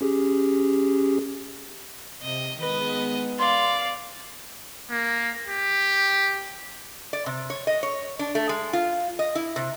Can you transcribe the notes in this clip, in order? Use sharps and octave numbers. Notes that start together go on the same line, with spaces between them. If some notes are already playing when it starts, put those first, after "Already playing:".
C#4 G4 G#4
C3 D#5
D#3 G#3 B3 B4 D#5
D5 F5 C6
A#3
G4
D5
C3
C#5
D#5
C#5
D4
A3
G#3
F4
D#5
E4
C3